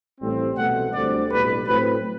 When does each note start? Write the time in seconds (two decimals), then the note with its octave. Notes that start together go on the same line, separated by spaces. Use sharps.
0.20 A1 A2 G3 C4
0.56 C2 B2 F#3 A3 F#5
0.93 D2 D3 G3 C4 D5
1.30 B1 A2 G3 B4
1.66 A2 F#3 C4 B4